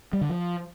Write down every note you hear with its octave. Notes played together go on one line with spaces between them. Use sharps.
G3
D3
F3